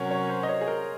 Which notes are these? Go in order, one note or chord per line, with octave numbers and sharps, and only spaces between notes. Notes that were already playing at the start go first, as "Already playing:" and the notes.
Already playing: C3 F#3 C#4 F#4 A#4 C#5
C#5
C5
D#5
C#5
G#4
A#4